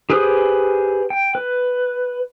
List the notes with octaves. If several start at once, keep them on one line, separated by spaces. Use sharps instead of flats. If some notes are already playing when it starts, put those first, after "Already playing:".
G4 G#4 B4 C5 D#6
G5
B4